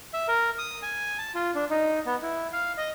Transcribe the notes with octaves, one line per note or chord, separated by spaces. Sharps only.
E5
A#4
D#6
G#5
A5
F4
D4
D#4
B3
E4
F5
D#5